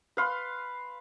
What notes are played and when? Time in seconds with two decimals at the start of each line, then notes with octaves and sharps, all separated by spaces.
0.17 B4 F5 C6